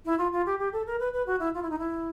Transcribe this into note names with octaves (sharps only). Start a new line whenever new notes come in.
E4
F4
F4
G4
G4
A4
A#4
B4
B4
F#4
E4
F4
E4
D#4
E4